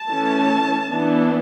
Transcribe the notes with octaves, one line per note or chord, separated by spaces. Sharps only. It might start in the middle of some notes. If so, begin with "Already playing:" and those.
Already playing: A5
E3 A3 C#4
E3 B3 D4